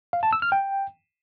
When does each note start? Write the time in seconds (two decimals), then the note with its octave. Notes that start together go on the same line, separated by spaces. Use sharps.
0.13 F5
0.23 A5
0.33 E6
0.42 F6
0.52 G5